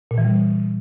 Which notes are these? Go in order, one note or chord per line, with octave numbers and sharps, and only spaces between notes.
A#2
E3
G3